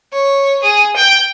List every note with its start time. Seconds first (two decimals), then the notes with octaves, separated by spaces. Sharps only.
0.13 C#5
0.63 G#4
0.96 G5